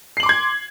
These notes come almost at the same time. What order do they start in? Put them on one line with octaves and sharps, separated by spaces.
C7 F#7 D6 C6 G#6